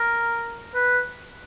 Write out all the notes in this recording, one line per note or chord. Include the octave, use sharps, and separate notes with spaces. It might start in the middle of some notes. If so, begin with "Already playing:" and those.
Already playing: A#4
B4